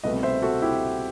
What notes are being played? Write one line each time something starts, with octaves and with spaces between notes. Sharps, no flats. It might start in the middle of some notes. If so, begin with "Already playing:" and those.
C2 B2 A3 C4 B4 D#5
C5 E5
F#4 A4
E4 G4